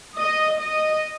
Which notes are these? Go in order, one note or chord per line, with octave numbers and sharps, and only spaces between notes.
D#5
D#5